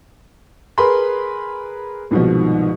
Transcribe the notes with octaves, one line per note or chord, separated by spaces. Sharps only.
G#4 A#4 B4 B5 C6
C2 G#2 B2 D#3 F3